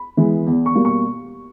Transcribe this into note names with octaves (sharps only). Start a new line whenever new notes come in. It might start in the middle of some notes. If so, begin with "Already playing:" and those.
Already playing: B5
E3 G#3 B3
E2
C#6
B2 G3 A#3
C#6